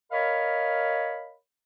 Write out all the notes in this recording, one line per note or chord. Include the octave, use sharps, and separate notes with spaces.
A#4 C#5 D#5 F5 B5